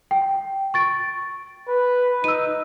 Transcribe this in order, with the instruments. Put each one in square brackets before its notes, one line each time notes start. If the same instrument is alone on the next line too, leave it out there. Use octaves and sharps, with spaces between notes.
[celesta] G5
C#6 A6 D7
[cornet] B4
[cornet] D#4 [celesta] E6 D#7